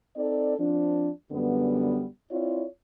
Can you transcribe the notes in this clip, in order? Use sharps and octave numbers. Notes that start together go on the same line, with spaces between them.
C4 D#4 A4 D5
F3 C4 D4
F#2 D3 G3 B3
C4 E4 F4 C#5 D5